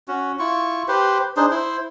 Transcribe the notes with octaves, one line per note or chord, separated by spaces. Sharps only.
C#4 F#4
E4 F4 C#6
G4 B4 C5
D4 D#4 G#4 C5
E4 C5